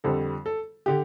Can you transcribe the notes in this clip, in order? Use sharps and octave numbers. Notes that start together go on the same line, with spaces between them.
F2 D3 G3 C4 A4
A4
D3 G4